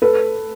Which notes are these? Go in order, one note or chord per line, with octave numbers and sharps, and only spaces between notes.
A4 B4